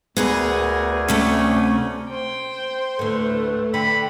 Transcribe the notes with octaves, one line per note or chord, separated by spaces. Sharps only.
D2 B3 G#4 A#4 G#5
C3 A3 C#4
C5 G5
D2 A2 A3 B4
D3 G5 B5